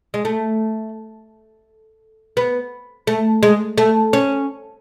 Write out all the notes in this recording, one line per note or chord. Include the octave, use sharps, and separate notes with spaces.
G#3
A3
B3
A3
G#3
A3
C#4